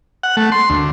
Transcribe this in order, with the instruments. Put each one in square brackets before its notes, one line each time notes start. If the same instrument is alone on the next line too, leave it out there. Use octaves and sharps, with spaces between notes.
[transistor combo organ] F#5
A3
C6
D2